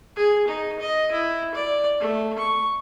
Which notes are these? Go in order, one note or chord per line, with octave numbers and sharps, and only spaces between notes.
G#4
D#4
D#5
E4
D5
A3
C#6